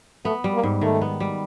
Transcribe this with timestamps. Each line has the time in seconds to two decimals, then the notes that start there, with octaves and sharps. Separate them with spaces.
0.25 A3 B3
0.44 G3
0.54 A#3
0.63 G#2
0.81 D#3 A3
1.01 B3
1.20 G3